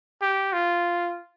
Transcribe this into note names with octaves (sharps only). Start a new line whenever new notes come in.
G4
F4